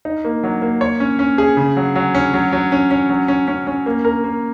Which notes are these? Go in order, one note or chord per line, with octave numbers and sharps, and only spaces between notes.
D#4
A#3
F#3
A#3
C#5
C#4
C#4
G#4
C#3
F#3
F#3
C#4
F#3
F#3
C#4
C#4
F#3
C#4
C#4
C#4
A#3
A#4
A#3